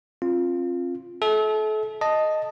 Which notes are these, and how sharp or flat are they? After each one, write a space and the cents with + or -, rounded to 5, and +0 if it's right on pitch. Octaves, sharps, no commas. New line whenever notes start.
C4 +35 F4 +0
A4 -35 E5 -35
D#5 +0 A5 +0